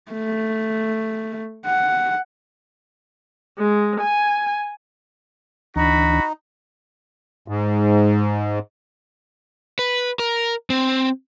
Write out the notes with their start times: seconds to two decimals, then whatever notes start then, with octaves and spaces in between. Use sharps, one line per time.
0.12 A3
1.66 F#5
3.58 G#3
4.01 G#5
5.76 D2 E3 D4 D#4 F#4 B5
7.48 G#2
9.79 B4
10.19 A#4
10.70 C4